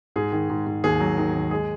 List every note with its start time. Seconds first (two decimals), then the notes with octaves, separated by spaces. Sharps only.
0.16 G#2 G#4
0.32 D#3
0.50 G#2
0.67 G#2
0.84 D#2 G#4
1.00 F#3
1.17 D#3
1.34 D#2
1.51 G#3 G#4